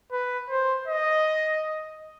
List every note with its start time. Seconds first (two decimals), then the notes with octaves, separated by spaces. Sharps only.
0.12 B4
0.50 C5
0.88 D#5